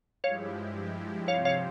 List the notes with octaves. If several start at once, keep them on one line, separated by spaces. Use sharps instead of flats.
G2 F3 G#3 E4 G4 C#5 F5
C3 F3 C4 G4 C5 C#5 F5
C#5 F5